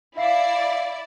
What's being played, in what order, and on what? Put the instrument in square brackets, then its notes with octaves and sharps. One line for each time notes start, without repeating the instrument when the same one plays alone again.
[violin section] E4 D5 [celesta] E5 F5 C7